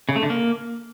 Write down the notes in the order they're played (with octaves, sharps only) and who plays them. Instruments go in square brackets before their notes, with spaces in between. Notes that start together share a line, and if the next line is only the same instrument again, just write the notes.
[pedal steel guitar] C#3
A3
D3
A#3